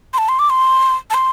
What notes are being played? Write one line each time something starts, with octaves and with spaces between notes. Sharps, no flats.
C6
A5
C6
D6
C6
A5
C6